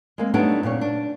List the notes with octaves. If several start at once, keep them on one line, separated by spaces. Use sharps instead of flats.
G#3 A#3 C4
F#3 G3 A3 B3 D4 D#4
A#2 C#3 C4 C#5
D4